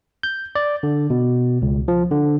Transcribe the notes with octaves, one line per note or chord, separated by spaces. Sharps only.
G6
D5
D3
B2
C#2
F3
D3